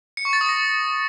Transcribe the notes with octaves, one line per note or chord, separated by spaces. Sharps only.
C#7
C#6
A6
D#6
A#6